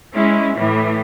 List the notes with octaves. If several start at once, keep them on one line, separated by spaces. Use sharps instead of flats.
G#3 C#4 E4
A2 E3